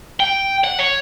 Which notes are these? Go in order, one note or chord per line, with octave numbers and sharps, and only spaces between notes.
G5
F#5
C#5